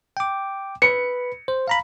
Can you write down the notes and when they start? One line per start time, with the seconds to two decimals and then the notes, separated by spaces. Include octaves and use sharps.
0.17 G5 D6
0.82 B4 B5 C#7
1.48 C5
1.68 F5 A#5 B5